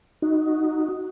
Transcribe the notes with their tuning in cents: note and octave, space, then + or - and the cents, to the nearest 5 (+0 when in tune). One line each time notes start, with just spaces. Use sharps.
D#4 +0 F#4 +0